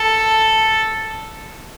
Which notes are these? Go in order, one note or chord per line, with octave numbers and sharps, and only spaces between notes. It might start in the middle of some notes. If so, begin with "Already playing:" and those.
Already playing: A4